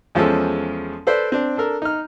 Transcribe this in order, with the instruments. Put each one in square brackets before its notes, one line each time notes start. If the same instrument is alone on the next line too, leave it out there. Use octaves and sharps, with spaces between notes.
[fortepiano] E2 F3 G#3 C#4 A4
A4 B4 C5 D5
C4 D4
D4 A4 A#4
D#4 F6